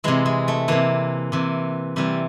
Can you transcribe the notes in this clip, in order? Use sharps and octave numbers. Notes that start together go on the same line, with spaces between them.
C3 E3 G#3
G#3
A3
C3 E3 A#3
C3 E3
C3 E3 G3